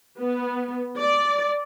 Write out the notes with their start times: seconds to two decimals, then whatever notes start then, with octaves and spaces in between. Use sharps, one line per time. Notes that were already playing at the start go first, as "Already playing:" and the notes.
0.20 B3
0.98 D5